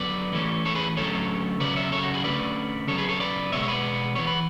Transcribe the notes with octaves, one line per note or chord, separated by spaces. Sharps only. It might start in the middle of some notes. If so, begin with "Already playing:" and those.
Already playing: D3 F#3 B3 B4 D5
E3 A3 C#4
A4 C#5
G#4 B4
D3 F#3 A3 C#4 A4 C#5
C#3 F#3 C#4 B4 D5
C#5 E5
A4 C#5
F#4 A4
E4 G#4
D3 A3 C#4 B4 D5
C#3 F#3 B3 A4 C#5
G#4 B4
A4 C#5
B4 D5
B2 G#3 B3 C#5 E5
C#5
B4 D5
E3 B3 C#5
B4